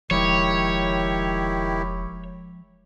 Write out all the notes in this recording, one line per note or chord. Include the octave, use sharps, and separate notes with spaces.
E1 D#3 F3 G#3 E4 G4 C#5